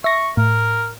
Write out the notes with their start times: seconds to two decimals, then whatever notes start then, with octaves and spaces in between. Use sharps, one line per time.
0.04 E5 C#6 A#6
0.37 A2 A#4